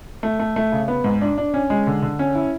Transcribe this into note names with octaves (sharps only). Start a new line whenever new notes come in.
A3
A3
A3
C#3
B3
G#2
D4
D4
C#4
G#3
D3
D3
C#4
E4